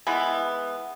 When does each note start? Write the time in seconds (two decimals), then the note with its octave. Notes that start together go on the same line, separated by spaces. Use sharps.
0.07 E3 G#3 B3